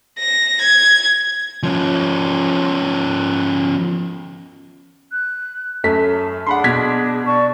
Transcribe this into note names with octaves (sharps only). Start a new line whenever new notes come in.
A#6
G#6
F3 C#4
F#6
F#2 A3 A5 B6
D4 G#4 F#5 B5 C6
B2 G#6 B6
D5 A5 C#6